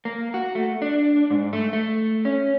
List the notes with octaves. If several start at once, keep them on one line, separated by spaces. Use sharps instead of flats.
A#3
F#4
A3
D4
G#2
A3
A3
C#4